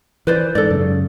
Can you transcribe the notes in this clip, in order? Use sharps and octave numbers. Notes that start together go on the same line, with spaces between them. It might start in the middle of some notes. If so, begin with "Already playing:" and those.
E3 B4 C5 D5
G#2 A4 D5
F#2 C#3